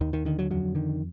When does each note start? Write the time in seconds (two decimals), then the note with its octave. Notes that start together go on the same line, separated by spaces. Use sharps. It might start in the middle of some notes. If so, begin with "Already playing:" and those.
0.01 D#2 D#3
0.13 D#3
0.25 D3 D#3
0.39 F#3
0.50 F2 F#3
0.75 D3 D#3